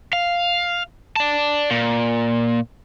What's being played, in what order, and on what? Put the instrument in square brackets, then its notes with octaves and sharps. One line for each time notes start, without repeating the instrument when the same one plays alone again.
[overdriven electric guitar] F5
D5 A5
A#2